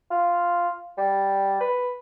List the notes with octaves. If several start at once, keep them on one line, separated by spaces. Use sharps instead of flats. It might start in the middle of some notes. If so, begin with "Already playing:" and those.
F4
G3
B4